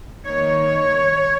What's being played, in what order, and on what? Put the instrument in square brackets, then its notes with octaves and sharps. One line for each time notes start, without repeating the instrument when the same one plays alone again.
[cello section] D#3 A#3 D#4 C#5